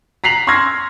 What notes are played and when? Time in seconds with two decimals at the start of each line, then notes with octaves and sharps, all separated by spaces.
0.24 A#5 B6 C7 F7 F#7
0.47 C6 C#6 E6 F6 G#6 A#6